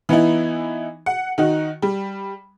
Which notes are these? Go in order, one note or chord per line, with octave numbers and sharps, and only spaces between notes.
E3 B3 D#4 E4
F#5
D#3 D#4 F#4
G3